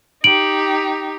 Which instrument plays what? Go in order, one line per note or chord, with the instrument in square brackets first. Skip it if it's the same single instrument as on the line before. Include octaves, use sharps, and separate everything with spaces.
[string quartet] D#4 G4 [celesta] D7 F#7